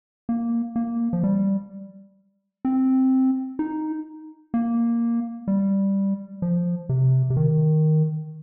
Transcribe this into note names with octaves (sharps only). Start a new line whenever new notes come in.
A#3
A#3
F3
G3
C4
D#4
A#3
G3
F3
C3
C3
D#3